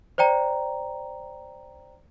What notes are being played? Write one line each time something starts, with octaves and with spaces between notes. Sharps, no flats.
C5 D5 G5 A#5